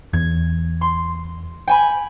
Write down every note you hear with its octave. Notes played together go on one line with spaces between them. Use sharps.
E2 G#6
C6
G5 G#5 B5